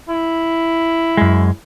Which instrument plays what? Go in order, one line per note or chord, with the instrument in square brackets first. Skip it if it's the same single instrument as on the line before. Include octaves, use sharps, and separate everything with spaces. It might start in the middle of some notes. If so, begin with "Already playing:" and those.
[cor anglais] E4
[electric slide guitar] F#2 G#3